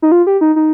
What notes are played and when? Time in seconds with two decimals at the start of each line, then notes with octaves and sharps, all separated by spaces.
0.02 D#4
0.12 F4
0.27 G4
0.41 D#4
0.56 D#4